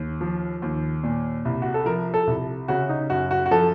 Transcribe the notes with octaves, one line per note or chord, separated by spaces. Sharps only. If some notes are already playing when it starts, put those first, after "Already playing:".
Already playing: D#2
F3
D#2
A#2
C2
F#4
A4
F3 A#4
A4
C2
C#3 F#4
D#4
F#2 F#4
F#4
F#4
F3 A4